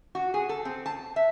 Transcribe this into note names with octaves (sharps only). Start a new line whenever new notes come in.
F#4
G#4
A4
C4
A5
E5